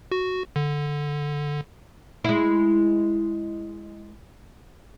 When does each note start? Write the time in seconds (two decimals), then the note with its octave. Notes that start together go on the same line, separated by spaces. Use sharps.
0.12 F#4
0.56 D3
2.24 G#3 E4